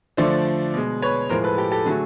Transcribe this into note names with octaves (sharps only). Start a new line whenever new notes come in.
D3 F3 A3 C5 D5
B2 G#3
B4 C#5
A2 F3 G#3 A#4 C5
A4 B4
G4 A4
G4 A4
D3 F#3 A3 F#4 G#4